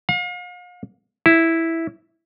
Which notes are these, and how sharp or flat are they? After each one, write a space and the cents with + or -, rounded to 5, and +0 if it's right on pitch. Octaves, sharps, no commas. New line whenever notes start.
F5 +40
E4 -5